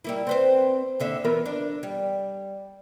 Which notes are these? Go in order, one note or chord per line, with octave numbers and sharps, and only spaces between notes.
G3 A#3 E4
C4 B4 C5
D#2 D3 E5
E3 B3 A#4
D4
G3